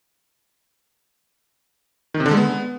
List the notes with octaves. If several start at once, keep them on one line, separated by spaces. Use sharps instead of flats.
D#3
C3
D3
G#3
B3